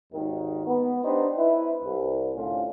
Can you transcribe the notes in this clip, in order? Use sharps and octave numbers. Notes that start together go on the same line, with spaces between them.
G#1 D#2 D#3
B3
D4 D#4 G4 B4 C5
E4 B4
C2
A2 D3 C#4 F4